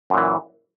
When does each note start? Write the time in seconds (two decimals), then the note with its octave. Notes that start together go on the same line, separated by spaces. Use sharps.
0.10 F#2
0.14 A#2
0.17 E3